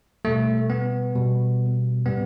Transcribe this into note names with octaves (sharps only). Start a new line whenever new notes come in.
B2 G3 A3
B3
B2 G3
A2 G3 B3